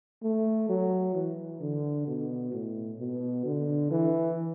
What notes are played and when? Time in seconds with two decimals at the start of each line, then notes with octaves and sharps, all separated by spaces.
0.23 A3
0.69 F#3
1.14 E3
1.61 D3
2.07 B2
2.53 A2
2.99 B2
3.45 D3
3.91 E3